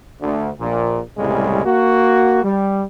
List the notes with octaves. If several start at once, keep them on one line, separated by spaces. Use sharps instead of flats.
D2
A#1 A#2
C2 A2 C#3 G3 G#3
A#3 F#4
G3